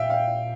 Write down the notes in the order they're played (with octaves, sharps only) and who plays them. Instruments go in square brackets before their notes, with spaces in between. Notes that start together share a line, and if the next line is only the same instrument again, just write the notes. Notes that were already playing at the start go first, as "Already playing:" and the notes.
Already playing: [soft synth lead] A#2 [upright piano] E5 F5 G5
[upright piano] F5